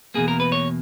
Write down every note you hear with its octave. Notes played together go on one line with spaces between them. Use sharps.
E2 B2 A#3 G#4
A#4
B4
C#5